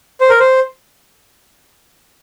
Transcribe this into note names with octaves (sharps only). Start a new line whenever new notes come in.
C5
A#4
C5